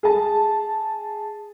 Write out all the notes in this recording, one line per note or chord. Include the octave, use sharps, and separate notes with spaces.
G#4 A5